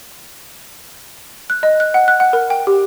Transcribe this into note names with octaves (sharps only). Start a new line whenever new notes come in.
F#6
D#5
F#6
F#5
F#6
F#5
A#4
G5
G4